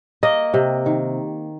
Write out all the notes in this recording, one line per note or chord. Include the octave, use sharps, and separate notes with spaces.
A#3 D#5
C3
D#3